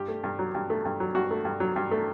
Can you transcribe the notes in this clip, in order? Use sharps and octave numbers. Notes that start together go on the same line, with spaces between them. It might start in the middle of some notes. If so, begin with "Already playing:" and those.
Already playing: G2 G4
A3
G2
F#3
G2
A3
G2
F#3
G2 F#4
A3
G2
F#3
G2
A3